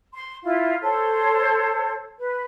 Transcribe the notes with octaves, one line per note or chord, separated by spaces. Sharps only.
C6
E4 F4
A4 C5 C#5
B4